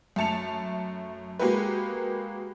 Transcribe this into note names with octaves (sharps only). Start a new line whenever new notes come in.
F#2 A3 A5 C#7 F7
G#3 A#3 F#4 G4 B4